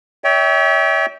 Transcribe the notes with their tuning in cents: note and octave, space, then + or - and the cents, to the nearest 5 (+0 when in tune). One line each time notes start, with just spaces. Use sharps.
C#5 +35 E5 -30 G5 +0